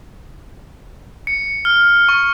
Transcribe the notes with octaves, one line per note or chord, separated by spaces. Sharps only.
C#7
F6
C#6